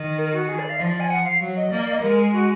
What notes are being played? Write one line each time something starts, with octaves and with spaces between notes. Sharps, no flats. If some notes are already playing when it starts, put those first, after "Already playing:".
Already playing: D#3
A#4
F#4
G#4
D5
F5
F3 D5
D5
G#5
F#5
F5
F#3
D#5
A#3 D5
D5
D#5
G#3 A#4
G#4
F#4